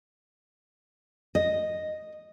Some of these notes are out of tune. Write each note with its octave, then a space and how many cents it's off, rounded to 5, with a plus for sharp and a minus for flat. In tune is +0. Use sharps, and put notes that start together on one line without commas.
D#5 -5